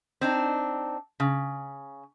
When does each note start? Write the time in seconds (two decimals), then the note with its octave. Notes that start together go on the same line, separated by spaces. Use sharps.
0.21 C4 D4 D#4
1.20 C#3